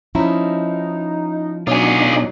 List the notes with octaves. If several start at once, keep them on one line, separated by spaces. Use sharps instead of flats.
F3 C#4 D#4 E4
B2 F#3 D4 D#4 F4 G#4